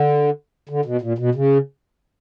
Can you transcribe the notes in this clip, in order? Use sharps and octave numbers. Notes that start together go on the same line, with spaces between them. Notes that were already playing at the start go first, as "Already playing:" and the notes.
Already playing: D3
D3
B2
A#2
B2
C#3